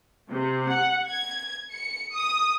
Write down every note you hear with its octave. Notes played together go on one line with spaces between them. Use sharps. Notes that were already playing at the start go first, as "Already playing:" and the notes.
C3
F#5
G#6
C#7
D#6